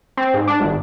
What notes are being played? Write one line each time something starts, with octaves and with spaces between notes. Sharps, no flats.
C4
G#2
D4
G#1